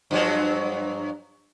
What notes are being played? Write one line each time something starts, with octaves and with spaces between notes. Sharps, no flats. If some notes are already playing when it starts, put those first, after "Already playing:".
G2 F3 F#3